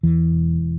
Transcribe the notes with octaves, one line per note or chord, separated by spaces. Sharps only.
E2 E3
E1